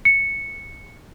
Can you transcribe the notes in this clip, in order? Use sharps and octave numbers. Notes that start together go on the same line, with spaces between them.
C#7